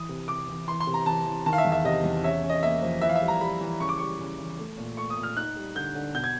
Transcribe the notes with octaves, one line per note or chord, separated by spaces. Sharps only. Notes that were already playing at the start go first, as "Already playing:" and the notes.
Already playing: E3 D#6
C3
C3 D6
E3
E3 C6
C6
C3
A#5
E3 A5
E3
D#3 A5
F5
E5
E2
E5
C3 D#5
E2
C#4 E5
C#4
D#5
A#3 E5
F3
E3 E5
F5
E5
G3
A#5
G3 B5
E3
C#3 C#6
D6
G3 C#6
C#3
E3
A3
A#2
A3 C#6
D#6
A#2
F6
D#4 F#6
G3
D3 G6
D3
B2 G6
G#6